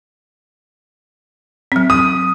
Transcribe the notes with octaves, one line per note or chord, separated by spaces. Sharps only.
F#3 C4
D#6